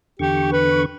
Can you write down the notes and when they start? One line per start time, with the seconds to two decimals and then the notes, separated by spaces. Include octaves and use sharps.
0.19 E2 D3 G4 C#6
0.52 B4